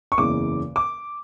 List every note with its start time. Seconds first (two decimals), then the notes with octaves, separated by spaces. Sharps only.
0.12 C#6
0.18 F#1 E2 C#3 E3 D6
0.76 D6